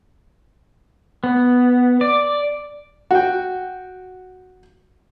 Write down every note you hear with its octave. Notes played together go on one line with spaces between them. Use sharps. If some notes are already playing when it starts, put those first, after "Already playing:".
B3
D5
F#4 G5